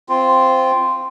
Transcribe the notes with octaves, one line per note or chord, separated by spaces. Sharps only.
C4 F4